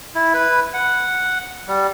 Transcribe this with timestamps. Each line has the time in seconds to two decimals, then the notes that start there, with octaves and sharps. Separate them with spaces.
0.15 E4
0.34 B4
0.74 F#5
1.68 G3